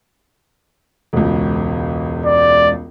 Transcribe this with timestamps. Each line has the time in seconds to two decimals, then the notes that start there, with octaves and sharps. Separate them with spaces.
1.13 E1 C#2
2.26 D5